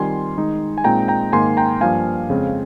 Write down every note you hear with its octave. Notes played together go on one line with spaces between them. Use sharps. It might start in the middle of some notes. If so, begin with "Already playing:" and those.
Already playing: D#3 G3 C4 F4 G#5 C6
D#3 G#3 D#4
G#5
A#2 G#3 C4 D#4 G5 A#5
G5 A#5
G#2 D#3 A#3 G#5 C6
G5 A#5
G2 F3 A#3 F5 G#5
F2 C#3 G#3 C4